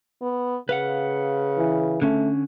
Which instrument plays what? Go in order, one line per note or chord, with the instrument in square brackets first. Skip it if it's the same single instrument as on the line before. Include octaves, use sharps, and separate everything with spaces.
[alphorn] B3
[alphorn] C#3 [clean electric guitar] B4 F5 F#5
[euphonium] E3
[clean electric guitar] D3 C#4 [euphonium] A3